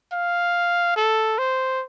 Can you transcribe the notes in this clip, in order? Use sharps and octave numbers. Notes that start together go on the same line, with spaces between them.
F5
A4
C5